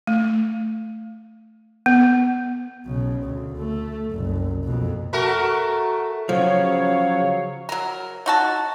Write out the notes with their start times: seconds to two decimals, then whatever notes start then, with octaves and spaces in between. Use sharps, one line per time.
0.07 A3
1.86 B3
2.85 B1 C#3
3.24 D2
3.58 A3
4.11 F#1 C2
4.64 F2 B2
5.13 A3 F#4 A#4
6.29 C#3 F3 F#3 C#5 F5
7.69 F#3 A#4
8.26 D#4 F#4 A5